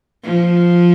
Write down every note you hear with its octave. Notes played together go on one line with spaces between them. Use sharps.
F3